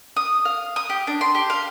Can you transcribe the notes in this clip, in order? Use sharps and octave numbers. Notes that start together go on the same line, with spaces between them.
D#6
F5
D#6
G4
D4
C6
G4
F5